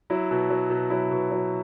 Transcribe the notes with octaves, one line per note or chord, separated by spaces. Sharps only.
F#3 E4
B2
F#3
B2
F#3 E4
B2
F#3